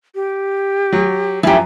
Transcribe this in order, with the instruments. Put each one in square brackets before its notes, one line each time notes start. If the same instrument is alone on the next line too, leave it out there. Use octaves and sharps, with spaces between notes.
[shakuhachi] G4
[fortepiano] F#3
[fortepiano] F#2 F3 [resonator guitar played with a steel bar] E4 G4 [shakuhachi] G#5